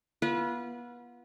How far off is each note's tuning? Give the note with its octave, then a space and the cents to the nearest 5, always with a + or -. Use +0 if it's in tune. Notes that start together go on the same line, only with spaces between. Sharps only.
B3 -40 F4 -25 B4 -25